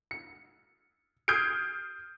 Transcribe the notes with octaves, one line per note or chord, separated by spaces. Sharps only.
C#7
D#6 F6 G6 G#6 C7 D7